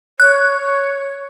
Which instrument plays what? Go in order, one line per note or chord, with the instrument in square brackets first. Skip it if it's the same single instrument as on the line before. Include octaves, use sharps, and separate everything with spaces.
[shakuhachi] C#5 [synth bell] F#6